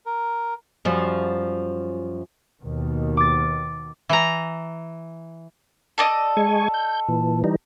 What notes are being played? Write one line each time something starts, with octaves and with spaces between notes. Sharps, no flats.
A#4
F#2 F3 G3
D#2 B2 D#3
D6 A6
E3 A#5
A4 D5 D#5
G#3 G#5 C#6
G6
A#2 E3
E3 G3 D#4